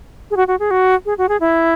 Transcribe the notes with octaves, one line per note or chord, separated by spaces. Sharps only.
G#4
F#4
F#4
G#4
F#4
G#4
F#4
G#4
E4